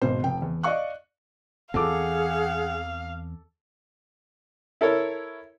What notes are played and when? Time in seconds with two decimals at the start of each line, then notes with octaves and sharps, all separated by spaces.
0.02 G#1 B2 C5
0.23 F1 G5
0.42 E2
0.63 D5 D#5 F5 C#6 F#6
1.74 E2 E3 C4 G#4 A4 F5 F#5 D6
4.81 E4 A4 A#4 C#5